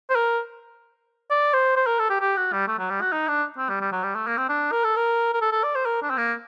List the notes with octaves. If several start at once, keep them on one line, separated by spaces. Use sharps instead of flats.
C5
A#4
D5
C5
C5
A#4
A4
G4
G4
F#4
G3
A3
F#3
G3
F#4
D#4
D4
C4
G3
G3
F#3
G3
A3
A#3
C4
D4
A#4
A4
A#4
A#4
A4
A4
D5
C5
A#4
D4
C4
A#3